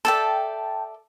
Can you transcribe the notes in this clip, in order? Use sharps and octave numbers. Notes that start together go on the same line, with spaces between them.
A4 D5 E5 G5 A5